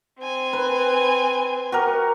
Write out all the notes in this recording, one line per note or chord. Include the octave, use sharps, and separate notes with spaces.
C4 G#5
B4
F#4 G4 A#4